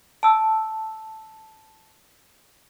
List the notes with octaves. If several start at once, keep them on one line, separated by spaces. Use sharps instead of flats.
A5 E6